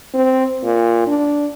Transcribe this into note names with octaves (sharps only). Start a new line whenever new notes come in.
C4
A#2
D4